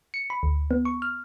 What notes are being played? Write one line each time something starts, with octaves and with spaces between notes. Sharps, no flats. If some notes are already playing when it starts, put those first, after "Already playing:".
C#7
B5
D2
B3
C#6
F6